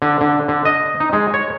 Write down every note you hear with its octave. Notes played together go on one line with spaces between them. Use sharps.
D3
D3
D3
D#5
D#4
G#3
C#5